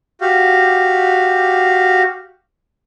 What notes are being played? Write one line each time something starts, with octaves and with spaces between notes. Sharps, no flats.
F#4 G4 F5